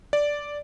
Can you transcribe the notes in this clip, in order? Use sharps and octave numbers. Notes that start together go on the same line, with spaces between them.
D5